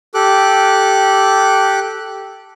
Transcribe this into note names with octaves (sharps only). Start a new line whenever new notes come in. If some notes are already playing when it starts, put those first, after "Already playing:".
G4 A4 D6 F#6